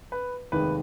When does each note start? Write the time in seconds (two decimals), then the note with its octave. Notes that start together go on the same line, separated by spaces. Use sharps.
0.12 B4
0.52 F1 D#2 D#3 G#3 B4